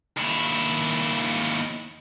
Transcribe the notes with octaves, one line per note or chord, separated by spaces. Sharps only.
D#2 E4